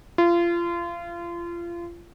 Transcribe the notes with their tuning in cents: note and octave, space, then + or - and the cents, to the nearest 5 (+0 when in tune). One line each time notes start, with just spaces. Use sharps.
F4 -30